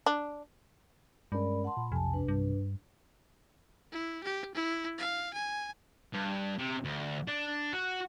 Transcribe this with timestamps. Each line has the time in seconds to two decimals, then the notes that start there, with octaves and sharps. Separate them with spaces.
0.06 D4
1.32 G2 G#3 C#4 A#4 D5 B5
1.64 F#5 A5 C6
1.77 A#2 B5
1.92 B1 F2 C3 G#5 A5
2.13 D4 B4
2.28 G2
3.92 E4
4.24 G4
4.55 E4
4.98 F5
5.34 G#5
6.13 G2
6.59 C3
6.85 D2
7.27 D4
7.73 F#4